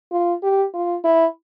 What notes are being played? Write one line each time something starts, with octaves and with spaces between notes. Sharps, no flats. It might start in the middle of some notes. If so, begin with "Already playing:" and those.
F4
G4
F4
E4